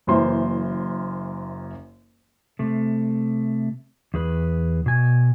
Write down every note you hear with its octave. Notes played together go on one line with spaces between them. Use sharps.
F#1 F#2 E3 A#3 C5 C6
C3 A3
E2 G#4 B4
B2 G#5